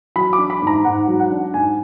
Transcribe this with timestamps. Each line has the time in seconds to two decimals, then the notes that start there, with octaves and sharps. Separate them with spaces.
0.16 F#3 B5
0.33 D6
0.38 D4
0.50 B5
0.62 G#2 A#5
0.85 G#2 F#5
1.08 F#3
1.20 F#5
1.31 D4
1.54 G#2 G#5